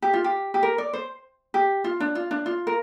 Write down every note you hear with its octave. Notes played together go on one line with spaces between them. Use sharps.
G4
F4
G4
G4
A#4
D5
C5
G4
F4
D4
F4
D4
F4
A#4